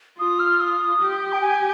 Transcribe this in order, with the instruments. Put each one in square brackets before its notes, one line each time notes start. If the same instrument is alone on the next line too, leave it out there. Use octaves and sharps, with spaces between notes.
[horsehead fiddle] F4 [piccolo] D#6
[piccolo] F6
D#6
[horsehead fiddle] G4
[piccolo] G5
G#5